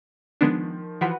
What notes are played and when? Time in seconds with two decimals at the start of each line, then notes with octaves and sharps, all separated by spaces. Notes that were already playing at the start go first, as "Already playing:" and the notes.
0.41 D#3 F3 G#3 B3 D4
1.01 E3 F3 F#4 B4 F#5 B6